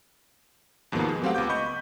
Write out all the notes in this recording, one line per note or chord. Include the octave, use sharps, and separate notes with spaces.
D#2 G#2 B2 F3 A#3 B3
G#3
F#3 A3 C4 G4 F5 F#5
C#2 B3 D6 G6
D#5 B5 C#6 G6
B5